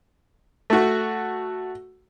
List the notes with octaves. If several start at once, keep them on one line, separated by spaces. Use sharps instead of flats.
A3 F#4